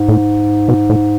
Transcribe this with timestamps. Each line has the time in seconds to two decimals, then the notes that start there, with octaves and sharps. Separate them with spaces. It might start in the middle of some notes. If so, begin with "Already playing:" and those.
Already playing: G#2
0.08 A2
0.68 B2
0.90 A2